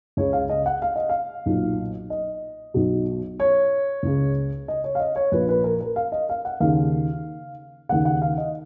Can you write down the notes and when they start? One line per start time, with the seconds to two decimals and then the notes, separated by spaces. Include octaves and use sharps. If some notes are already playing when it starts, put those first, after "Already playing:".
0.17 C#2 C#3 C#5
0.33 F5
0.49 D#5
0.66 F#5
0.82 F5
0.96 D#5
1.09 F5
1.46 B1 A#2
2.10 D#5
2.74 B1 B2
3.40 C#5
4.03 C#2 C#3
4.68 D#5
4.84 C#5
4.95 F5
5.00 D#5
5.16 C#5
5.32 A#1 A#2 B4
5.49 B4
5.64 A#4
5.81 A#4
5.96 F5
6.12 D#5
6.29 F5
6.45 F#5
6.60 D#2 C#3 F5
7.89 D#2 C#3 F#5
8.05 F#5
8.22 F5
8.38 D#5